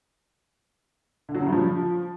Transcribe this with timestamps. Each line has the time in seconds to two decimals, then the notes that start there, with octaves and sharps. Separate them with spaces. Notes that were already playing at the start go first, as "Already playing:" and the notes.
1.29 D3
1.35 F#3
1.41 C#3
1.46 G2
1.52 F3